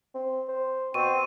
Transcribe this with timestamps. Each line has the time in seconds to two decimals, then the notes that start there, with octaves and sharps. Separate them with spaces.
0.15 C4
0.49 C5
0.94 B2 C4 C#6 D#7